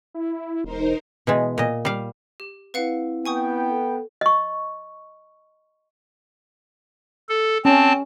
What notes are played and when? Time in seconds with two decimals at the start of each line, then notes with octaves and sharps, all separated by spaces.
0.14 E4
0.64 E1 D#4 A#4 C5
1.27 B2 E3 G#3
1.58 A#2 D#5
1.85 G3 F5
2.40 G4
2.74 C4 E4 B4 F5 F#5
3.26 B3 B4 G5 G#5 C#6 D#6
3.70 A4
4.21 D#5 C#6
7.29 A4
7.65 C4 C#4 A5